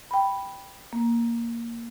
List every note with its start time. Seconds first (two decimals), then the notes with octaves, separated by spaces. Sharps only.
0.11 G5 B5
0.93 A#3